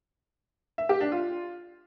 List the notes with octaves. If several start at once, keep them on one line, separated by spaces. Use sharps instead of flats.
E5
G4
D4
F4